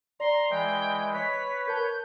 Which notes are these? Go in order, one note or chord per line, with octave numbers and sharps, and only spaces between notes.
D5 A#5 C6
E3 G#3 G5
B4 C#5 B6
A#4 A5 G6